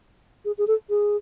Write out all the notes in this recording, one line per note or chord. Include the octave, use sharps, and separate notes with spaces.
G#4
G#4
A4
G#4